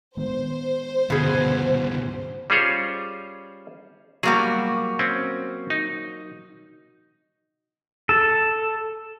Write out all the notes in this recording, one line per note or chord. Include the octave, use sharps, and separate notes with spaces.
D#3 G#3 B3 C5
C#2 G2 B2 D3 G#4
G3 C#4 F4 G#4 C5 C#5
F#3 G3 A#3 F#4 G#4
C4 C#4
D#4
A4